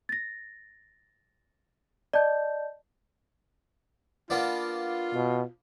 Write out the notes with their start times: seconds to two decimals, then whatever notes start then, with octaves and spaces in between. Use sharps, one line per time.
0.09 A6 A#6
2.13 D5 D#5 A5 G6
4.30 A#3 B3 D4 F4
5.14 B2